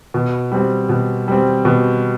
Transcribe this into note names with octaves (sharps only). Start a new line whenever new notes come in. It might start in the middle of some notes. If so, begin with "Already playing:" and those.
B2
G3 C4
B2
G3 C4
B2